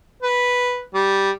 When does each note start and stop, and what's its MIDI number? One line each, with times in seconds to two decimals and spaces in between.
0.23 0.83 71
0.94 1.31 55